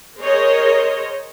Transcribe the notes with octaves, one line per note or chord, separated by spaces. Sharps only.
G#4 A#4 C5 C#5 D#5